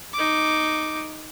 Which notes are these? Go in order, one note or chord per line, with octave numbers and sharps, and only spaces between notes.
D#4 D6